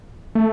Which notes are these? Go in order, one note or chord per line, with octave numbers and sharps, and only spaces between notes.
A3